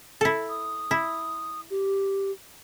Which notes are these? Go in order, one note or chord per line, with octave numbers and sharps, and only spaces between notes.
E4 A4
D#6
E4
G4